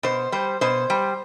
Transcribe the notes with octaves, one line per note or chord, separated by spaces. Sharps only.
B2 C5
G3 C5
B2 C5
G3